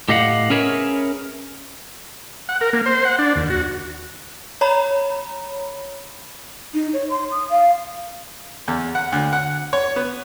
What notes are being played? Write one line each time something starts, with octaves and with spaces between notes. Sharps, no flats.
A2 G4 D#5 F5 F#5
C#4 G#4 A#4 B4 C#5 E5
F#5
A#4
A#3
C5
F#5
D4
D#2
F#4
C#5 A#5 B5
D#4
C#5
C6
D#6
F5
E2
F#5
D2
F#5
C#5
B3